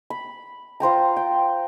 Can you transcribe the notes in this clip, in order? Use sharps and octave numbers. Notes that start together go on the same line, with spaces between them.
B5
F4 C5 G5 A#5
G5